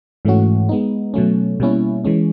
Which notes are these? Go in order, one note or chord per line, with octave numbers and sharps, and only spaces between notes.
G#2 E3 A3 C#4 F#4
G#3 B3 D#4
B2 F#3 A3 C#4
B2 G3 A#3 C#4 E4
E3 G#3 C#4